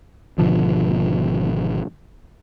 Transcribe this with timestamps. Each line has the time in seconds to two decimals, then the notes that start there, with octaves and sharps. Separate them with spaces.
0.38 G#1 B2 D3 F3